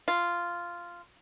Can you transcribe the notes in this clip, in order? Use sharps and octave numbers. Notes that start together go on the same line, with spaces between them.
F4